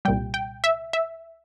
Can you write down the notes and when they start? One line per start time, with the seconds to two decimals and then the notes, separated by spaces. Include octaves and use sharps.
0.05 C2 A#2 G3 G5
0.34 G5
0.64 E5
0.93 E5